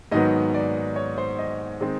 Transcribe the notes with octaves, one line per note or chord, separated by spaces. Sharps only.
G#2 D#3 F#3 B3 D#5
D5
C#5
C5
D#5
D#3 G#3 C4 D#4